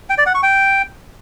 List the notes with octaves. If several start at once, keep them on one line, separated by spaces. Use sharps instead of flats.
G5
D5
F#5
C#6
G5